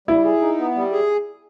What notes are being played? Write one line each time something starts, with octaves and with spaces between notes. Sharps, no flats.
G3 E4
G#4
D#4
B3
G3
G#4